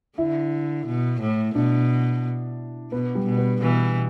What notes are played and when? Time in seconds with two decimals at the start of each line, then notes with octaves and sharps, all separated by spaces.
0.18 D3 E4
0.87 B2
1.21 A2
1.55 B2 D4
2.92 B2 B3
3.15 G3
3.26 B2
3.38 B3
3.61 B2 E3